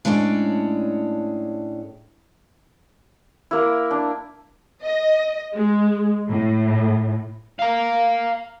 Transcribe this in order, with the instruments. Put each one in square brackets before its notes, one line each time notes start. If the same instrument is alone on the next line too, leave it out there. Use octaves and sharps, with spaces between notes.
[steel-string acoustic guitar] A2 G#3 C#4 D4 D5
[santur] A#3 E4
D4
[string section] D#5
G#3
A2
[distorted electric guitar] F5 A#5